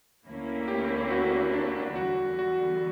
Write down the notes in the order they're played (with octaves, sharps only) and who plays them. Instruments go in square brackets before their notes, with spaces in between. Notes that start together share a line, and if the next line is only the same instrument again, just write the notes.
[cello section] D2 D3 A#3 C#4 E4
[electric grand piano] G4
F#4
D4
[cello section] E2 D3 G3 [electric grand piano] F#4
[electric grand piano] F#4